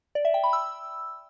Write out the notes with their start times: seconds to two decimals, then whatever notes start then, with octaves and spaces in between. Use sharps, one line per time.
0.15 D5
0.25 E5
0.34 G5
0.44 B5
0.53 E6